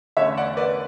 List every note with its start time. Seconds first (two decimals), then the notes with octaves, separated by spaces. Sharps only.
0.17 E2 D3 A3 C#4 C#5 E5
0.37 D5 F#5
0.57 B4 D5